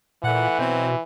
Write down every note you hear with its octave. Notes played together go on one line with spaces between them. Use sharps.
A#2 E3 A3 F#5
B2 F#3 C4